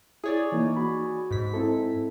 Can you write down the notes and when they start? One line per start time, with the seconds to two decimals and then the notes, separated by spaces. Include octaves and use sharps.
0.24 E4 G#4 C#5 D5
0.52 E3 A#3 D#4
0.77 F#4 B5
1.31 G#2 B6
1.54 C4 E4 A4